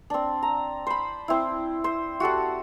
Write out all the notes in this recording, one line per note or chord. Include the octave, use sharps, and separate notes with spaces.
C4 D4
A#5
C5 B5
C4 E4
C5
F#4 G4 A4 F#5